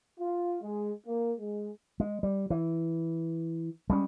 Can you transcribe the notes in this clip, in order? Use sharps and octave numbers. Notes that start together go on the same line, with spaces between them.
F4
G#3
A#3
G#3
G#3
G3
E3
G3 G#3 C#4